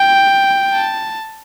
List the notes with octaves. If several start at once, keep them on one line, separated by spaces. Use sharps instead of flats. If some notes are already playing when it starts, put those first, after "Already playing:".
Already playing: G5
A5